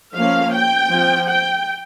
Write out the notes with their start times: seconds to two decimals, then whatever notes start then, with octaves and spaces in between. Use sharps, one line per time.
0.16 F3 A#3 C#4 F5
0.53 G5
0.91 F3 C4
1.29 G5